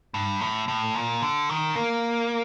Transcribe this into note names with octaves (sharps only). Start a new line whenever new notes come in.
G2
A2
A2
A#2
D3
D#3
A#3